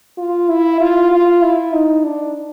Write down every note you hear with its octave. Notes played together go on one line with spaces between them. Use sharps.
F4
E4
F4
F4
E4
D#4
D4